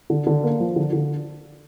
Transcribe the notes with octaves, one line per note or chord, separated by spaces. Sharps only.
D3
D3
A#3
F3
D3
D3